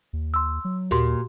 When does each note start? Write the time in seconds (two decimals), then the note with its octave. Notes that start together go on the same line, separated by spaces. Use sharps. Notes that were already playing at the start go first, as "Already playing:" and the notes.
0.13 D#2
0.34 C6 E6
0.65 F#3
0.91 D#2 A#2 F#4 G4 C6